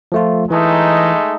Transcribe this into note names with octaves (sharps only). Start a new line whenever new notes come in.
F3 A3 F4
E3 G#3 A3 D#4